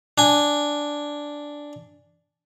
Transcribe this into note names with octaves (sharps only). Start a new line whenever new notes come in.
D4 G#5